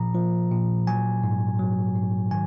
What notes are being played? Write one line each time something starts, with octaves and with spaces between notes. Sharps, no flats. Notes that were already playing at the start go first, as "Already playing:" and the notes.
Already playing: A#2 F3 A#5
F3
A#2
F#3 G#5
G#2
F#3
G#2
D#3 G#5